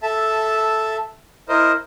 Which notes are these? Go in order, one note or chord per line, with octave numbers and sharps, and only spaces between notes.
A4 E5 A5
E4 A#4 C5 D#5